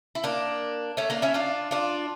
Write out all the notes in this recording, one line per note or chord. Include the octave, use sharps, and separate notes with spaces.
E4
A#3 D4
A3 C#4
A#3 D4
C#4 E4
D4 F4
D4 F4